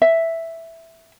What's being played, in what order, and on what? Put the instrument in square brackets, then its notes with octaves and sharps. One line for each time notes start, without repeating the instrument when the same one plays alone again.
[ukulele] E5